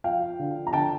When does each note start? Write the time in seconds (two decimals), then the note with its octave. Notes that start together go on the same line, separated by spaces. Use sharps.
0.04 F3 F5 G5
0.39 D3
0.67 A#5
0.73 D3 G5 A5